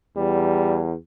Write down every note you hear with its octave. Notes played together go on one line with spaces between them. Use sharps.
E2 G3